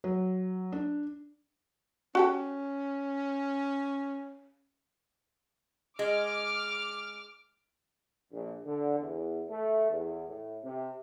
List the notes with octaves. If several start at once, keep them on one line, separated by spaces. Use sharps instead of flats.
F#3
D4
C#4 F#4 G4 A4
G#3 D6 F6
A#1
D3
E2
A3
E2
A2
C3